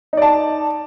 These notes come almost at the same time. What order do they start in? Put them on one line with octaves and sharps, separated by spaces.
D#4 D5 A5